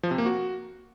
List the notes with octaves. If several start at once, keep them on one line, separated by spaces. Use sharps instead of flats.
F3
C3
A#3
F#4